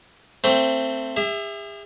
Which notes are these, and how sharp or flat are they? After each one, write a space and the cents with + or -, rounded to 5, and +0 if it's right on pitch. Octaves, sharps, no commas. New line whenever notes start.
A3 +25 C4 +0
G#4 -45 E5 +0